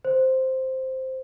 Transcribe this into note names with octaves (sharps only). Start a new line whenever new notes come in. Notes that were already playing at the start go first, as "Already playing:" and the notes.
C5